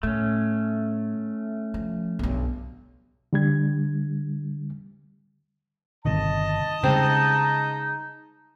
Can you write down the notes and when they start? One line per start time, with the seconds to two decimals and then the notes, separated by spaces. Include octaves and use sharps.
0.03 A2 A3 C#4
1.74 F3
2.19 B1 G2
3.33 D3 G3 G#6
6.05 G1 C3 D#3 D#5 A5
6.83 C#3 G3 G#3 C4 D#4